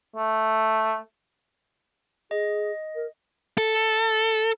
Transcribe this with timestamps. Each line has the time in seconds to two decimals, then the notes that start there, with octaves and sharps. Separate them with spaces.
0.16 A3
2.31 G#4 D#5
2.95 A#4
3.58 A4